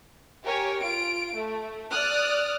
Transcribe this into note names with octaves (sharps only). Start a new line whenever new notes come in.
G4 A#4 C#5 G#5
F4 D7
A3
D5 D#6 F6 F#6